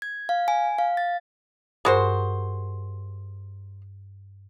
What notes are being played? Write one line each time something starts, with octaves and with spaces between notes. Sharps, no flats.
G#6
F5
G#5
F5
A6
G2 G#3 F#4 A#4 C5 C6